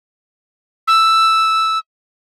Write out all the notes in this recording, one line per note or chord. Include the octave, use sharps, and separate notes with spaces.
E6